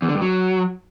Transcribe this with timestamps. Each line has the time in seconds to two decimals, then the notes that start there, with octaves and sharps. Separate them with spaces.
0.02 E2
0.09 D3
0.15 G2
0.21 F#3